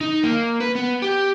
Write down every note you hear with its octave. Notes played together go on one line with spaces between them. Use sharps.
D#4
A#3
B4
B3
G4